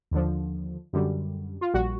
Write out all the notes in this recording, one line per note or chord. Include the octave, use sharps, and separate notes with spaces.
D#2 D3 F3
F#2 D3 G3
F4
A#1 A#2 G3 F#4